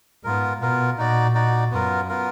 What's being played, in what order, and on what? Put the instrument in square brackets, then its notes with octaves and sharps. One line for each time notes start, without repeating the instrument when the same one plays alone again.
[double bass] G#2 [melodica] B3 F4 A#4
[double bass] B2 [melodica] B3 F4 A#4
[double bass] A#2 [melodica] D#4 F#4 D5
[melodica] D#4 F#4 D5
[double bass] F#2 [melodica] B3 F4 A#4
[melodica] B3 F4 A#4